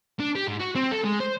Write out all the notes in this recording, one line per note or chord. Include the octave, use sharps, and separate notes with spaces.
D4
G4
G#2
F#4
C4
A4
G#3
C5